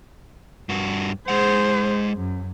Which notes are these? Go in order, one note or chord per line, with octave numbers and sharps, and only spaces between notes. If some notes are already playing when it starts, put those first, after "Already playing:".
G2 F#4
G#3 G#4 C5 F#5
F#2